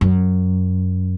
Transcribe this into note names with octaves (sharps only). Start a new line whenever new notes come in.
F#2